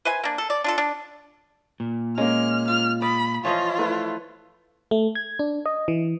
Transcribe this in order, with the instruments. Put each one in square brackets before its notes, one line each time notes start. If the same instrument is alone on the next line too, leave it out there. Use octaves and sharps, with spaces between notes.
[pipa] B4 C5 E5 G#5
A#3 D4
A4
D5
D4 F4 A4
D4
[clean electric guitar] A#2
[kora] G#3 [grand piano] A#3 C#4 [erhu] F6
[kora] F4 [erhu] F6
[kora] D5 [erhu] B5 [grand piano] D#6
[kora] E3 F3 D#5 [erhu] F4 [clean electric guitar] C#5
[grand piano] A3 E4 B4
[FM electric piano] A3
G#6
D4
D#5
E3